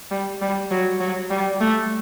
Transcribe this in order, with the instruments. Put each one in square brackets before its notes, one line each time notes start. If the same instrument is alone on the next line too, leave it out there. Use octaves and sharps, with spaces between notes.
[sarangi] G3
G3
F#3
F#3
G3
A3